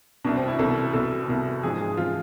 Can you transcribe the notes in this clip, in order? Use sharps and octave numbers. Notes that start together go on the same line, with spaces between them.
C2 B2 D4
C4
E4
C2 B2 A4
C2 B2 A4
C2 B2
G#2 F3 G#4
G#4
F3 F4